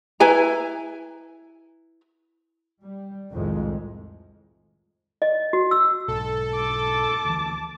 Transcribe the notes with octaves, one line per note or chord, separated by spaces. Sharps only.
E4 B4 G#5 A#5
G3
C2 F2 A2 D#3 F3 G#3
D#5
F#4
E6
B1 G#2 A4
A5 D6
D2 E3